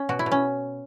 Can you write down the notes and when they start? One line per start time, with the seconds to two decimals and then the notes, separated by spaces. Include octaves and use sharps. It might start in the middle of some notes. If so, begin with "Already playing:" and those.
Already playing: C#4
0.09 B2 F#4
0.19 E4
0.26 B2
0.31 C#4